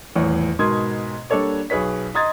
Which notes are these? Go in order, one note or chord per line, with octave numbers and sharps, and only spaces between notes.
D#1 E2 A2 C#5
G#2 B2 A#4 C6 D#6 G#6
G3 A#3 D4 A4 C#5 D5
B1 G#4 B4 C#5 B6
D#5 A#5 C6 D#6 G#6 A6